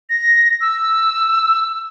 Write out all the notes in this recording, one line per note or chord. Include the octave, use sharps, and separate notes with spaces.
A#6
E6